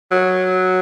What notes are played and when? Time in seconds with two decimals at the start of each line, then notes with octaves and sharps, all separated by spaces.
0.12 F#3